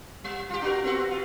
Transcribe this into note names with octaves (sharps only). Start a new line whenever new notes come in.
G3
F4 G4
D4 F#4 A#4
B3 C4 F#4
F4